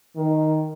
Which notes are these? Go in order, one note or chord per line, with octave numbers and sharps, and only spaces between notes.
D#3